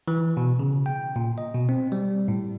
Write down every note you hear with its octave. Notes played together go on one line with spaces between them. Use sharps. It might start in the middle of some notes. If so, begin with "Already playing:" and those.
E3
B2
C#3
G5
A#2
D#5
B2
C4
G3
A2